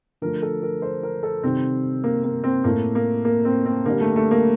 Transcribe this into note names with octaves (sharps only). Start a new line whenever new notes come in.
D3 F3 A3 A#4
A4
A#4
C5
A#4
A4
C3 D#3 G3 C4
A#3
A#3
C4
A2 A3 A#3
A#3
A#3
C4
C4
D3 G3 A#3
A3
A3
A#3